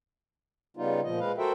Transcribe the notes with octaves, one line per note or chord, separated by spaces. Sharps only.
C#3 G3 B3 D#4 F4
A#2 F3 D#5
G#3 B4 F5
F#4 A4 A#4 C5 E5 G5